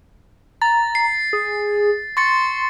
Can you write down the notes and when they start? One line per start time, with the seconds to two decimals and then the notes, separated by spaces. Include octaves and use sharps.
0.62 A#5 A6
0.95 C7
1.33 G#4
2.17 C6 C#6 A6 C#7